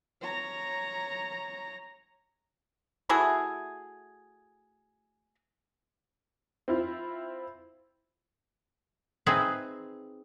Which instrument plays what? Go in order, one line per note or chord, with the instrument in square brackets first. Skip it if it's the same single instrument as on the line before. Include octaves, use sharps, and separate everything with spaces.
[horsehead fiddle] C#5 A#5
[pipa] A3 E4 F#4 G#4
[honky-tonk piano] C4 E4 F4
[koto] C4 D#4 G#4 B4 E5